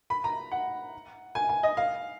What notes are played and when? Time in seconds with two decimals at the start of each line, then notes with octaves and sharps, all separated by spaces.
0.10 B5
0.24 A#5
0.51 F#5
1.35 G#5
1.49 G#5
1.63 D#5
1.77 F5